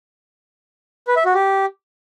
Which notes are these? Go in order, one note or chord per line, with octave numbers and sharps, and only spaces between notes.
B4
E5
F#4
G4